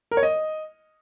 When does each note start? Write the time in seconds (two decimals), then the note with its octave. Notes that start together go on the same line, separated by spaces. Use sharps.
0.11 A#4
0.17 C#5
0.23 D#5